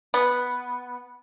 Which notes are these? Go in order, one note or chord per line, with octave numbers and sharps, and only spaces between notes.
B3